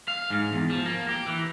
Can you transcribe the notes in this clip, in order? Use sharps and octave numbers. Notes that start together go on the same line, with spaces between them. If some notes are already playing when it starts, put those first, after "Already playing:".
F5
G#2
E2
F3
A#3
G4
E3